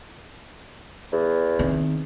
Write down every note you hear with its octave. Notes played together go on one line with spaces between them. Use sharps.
E2
D#3 C4